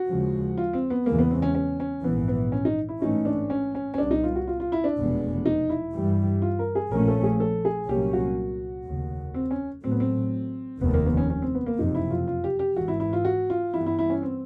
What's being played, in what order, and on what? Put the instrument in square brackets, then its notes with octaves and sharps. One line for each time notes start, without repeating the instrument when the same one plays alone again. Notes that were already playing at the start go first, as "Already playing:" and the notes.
Already playing: [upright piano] F#4
[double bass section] D#2 C#3 F3 G#3
[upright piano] F4
C4
B3
[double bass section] E2 C#3 E3 G#3 [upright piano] A#3
[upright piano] B3
C4
C#4
C#4
C#4
[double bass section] A#1 G#2 E3 [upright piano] B3
[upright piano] B3
C#4
D#4
E4
[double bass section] A1 G#2 E3 A3 C#4 [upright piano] D#4
[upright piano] D4
C#4
C#4
C#4
[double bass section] C2 A#2 G3 B3 [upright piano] D4
[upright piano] D#4
F4
F#4
F4
F4
E4
D4
[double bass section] F1 E2 B2 G#3 B3
[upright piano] D#4
E4
[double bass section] G2 E3 G3
[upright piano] F4
A#4
G#4
[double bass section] A#1 A#2 F3 A3 C#4 [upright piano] A#4
[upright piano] A4
G#4
A4
G#4
[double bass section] C2 A#2 F#3 A#3 C#4 [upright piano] G4
[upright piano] F#4
[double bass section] F1 D#2 C#3
[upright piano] C4
C#4
[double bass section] A1 A2 F#3 A3 [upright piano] C4
[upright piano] B3
C4
[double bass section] F1 D#2 D#3 [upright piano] B3
[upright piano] A#3
B3
C#4
C#4
C4
B3
A#3
[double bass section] F#1 F2 C3 [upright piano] D#4
[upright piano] E4
F4
F4
G4
G4
[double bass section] G#1 G#2 E3 [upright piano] F#4
[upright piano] E4
E4
F4
F#4
F4
[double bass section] G2 E3 G3 B3 [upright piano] E4
[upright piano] E4
E4
C#4
C4